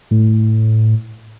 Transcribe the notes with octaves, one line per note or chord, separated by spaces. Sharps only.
A2